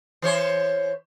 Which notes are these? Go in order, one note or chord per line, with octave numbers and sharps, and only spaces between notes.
E3 C5 C#5